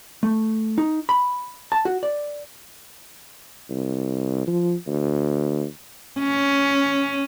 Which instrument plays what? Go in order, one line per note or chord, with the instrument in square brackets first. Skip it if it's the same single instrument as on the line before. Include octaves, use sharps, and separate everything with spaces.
[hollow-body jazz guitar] A3
D#4
B5
A5
F#4
D5
[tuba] C2
F3
D2
[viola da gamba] C#4